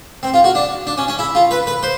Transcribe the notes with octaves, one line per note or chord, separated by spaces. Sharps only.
C4
F4
F#4
D4
D4
C#4
C#4
E4
F4
B4
B4
C5